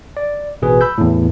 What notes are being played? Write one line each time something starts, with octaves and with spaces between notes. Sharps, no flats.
D5
A1 B2 G#4 B4
B5 E6 G6
E2 A2